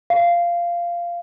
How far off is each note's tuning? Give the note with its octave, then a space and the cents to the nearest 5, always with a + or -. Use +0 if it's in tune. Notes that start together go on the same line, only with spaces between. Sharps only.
F5 -10